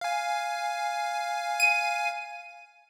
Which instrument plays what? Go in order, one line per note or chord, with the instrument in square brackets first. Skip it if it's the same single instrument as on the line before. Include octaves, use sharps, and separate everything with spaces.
[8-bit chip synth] F5 G#5
[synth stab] D#7